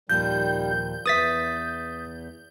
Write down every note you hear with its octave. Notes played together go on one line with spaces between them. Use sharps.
D#2 A#2 D#3 F3 G3 G6
E2 B4 E5 D#6 A6 B6